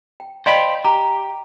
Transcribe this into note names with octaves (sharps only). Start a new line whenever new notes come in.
G5
C5 D5 D#5 F5 G5 B5
G4 A#5